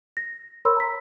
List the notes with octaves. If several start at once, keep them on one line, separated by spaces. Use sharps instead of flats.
A#6
A#4 C#5 B5 C6 E6
A#5 B6